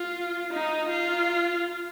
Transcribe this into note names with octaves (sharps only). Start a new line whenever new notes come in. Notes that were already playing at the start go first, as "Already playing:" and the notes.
Already playing: F4
D#4
F4